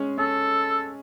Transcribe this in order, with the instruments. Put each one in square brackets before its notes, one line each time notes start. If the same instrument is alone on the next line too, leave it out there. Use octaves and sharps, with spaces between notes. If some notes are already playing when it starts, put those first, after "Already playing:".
Already playing: [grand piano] G#3 C#4
[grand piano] C#4 [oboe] A4